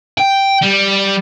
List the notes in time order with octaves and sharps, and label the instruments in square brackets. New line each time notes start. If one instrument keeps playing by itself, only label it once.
[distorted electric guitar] G5
G3